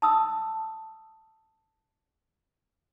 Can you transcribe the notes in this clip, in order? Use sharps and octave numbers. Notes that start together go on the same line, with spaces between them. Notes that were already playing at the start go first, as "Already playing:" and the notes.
A5 D#6 E6